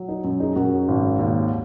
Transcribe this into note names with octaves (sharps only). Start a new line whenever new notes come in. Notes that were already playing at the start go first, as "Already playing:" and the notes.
Already playing: F#3
D#4
F#2
D#4 G#4
F#2 F#4 A#4
G#1
D#2